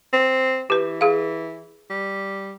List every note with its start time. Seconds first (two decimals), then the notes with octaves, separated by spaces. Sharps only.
0.13 C4
0.70 E3 G4 B4
1.01 G#4 F5
1.90 G3